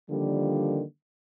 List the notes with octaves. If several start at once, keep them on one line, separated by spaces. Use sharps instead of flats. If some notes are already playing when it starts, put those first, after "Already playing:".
D3 D#3 F3 G3 A#3